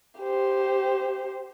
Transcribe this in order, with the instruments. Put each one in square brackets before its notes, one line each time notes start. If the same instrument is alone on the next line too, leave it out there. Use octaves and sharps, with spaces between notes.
[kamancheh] G4 C5